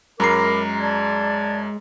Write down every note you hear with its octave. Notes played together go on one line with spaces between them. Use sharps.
F#2 G#3 A#4 A#5 B5 D6 C7
D5 A5 G#6